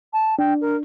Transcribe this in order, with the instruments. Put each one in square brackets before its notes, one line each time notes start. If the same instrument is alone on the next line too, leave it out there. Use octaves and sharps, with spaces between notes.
[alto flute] A5
[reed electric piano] D4 [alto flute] G5
[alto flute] A#4